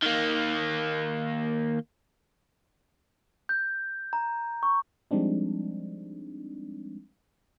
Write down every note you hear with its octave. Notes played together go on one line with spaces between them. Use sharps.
D#3 A#3
G6
A#5
C#6
F3 G3 G#3 C4 D4 D#4